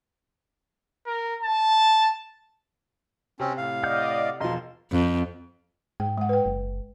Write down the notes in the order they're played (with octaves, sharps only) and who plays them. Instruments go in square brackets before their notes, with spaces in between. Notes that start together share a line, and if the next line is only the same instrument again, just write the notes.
[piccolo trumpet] A#4
A5
[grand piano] C3 [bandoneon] C4 C#4
[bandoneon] A2 F5
[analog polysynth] D5 D#5 [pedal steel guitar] F#5 F6 G6
[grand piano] E1 F3 [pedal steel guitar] D#5 F5 A#5 [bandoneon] C6
[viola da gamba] F2
[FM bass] G#2 [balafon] G5
[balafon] G#3 F#5
B4 G5
[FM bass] F#1